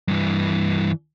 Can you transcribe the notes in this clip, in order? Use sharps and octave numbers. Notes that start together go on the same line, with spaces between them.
G2 E3